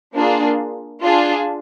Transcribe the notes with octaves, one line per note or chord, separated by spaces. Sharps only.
A#3 D4 F4 G#4
D4 F4 G#4